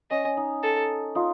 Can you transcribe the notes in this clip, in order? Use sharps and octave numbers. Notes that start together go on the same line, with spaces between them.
C#4 D#5
C#4
D#4
A4
D#4 F4